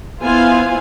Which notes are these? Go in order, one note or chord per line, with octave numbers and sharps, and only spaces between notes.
B3 E4 F4 C5 F5 G#5